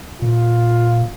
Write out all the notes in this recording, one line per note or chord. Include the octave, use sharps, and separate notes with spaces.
A#2 F4